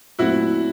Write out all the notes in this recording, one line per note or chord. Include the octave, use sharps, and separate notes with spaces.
A#2 F#3 A3 C4 E4 F#4